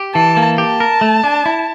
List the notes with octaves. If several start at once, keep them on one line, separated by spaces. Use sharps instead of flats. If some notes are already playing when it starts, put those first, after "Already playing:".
Already playing: G4
E3 A5
A#3
G4 A5
A#4
A3
D4
E4